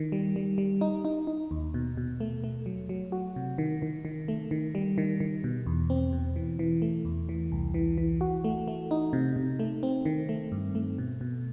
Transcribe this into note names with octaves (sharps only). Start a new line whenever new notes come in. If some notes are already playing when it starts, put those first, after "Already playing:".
Already playing: D#3
G3
G3
G3
D#4
D#4
D#4
D#2
B2
B2
A3
A3
F#3
F#3
F#4
C3
D#3
D#3
D#3
A3
D#3
G3
D#3
D#3
B2
E2
C4
B2
E3
E3
A3
E2
E3
C2
E3
E3
F#4
A3
A3
D#4
C3
C3
A3
C4
D#3
A3
G2
A3
B2
B2